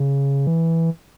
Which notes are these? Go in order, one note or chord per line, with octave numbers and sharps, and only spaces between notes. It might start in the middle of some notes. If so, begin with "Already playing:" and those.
Already playing: C#3
E3